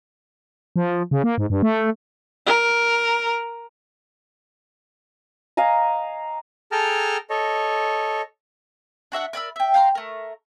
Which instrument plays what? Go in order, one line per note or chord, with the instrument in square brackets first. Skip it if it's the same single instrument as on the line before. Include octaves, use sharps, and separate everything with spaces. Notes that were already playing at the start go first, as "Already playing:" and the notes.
[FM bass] F3
C#3
A#3
G#2
G2
A3
[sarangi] A#4
[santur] D#5 F5 G#5 A#5
[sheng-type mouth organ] G#4 A4 G5 A5 A#5 F6
A4 C#5 D#5
[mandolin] D4 F#4 E5 F#5
A#4 D5 B5 E6
E5 G5
F5 G5 A#5 C6
A3 A#4